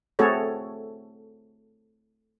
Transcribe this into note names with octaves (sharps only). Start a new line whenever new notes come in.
A3 C4 F#4 G#4 A4 C#5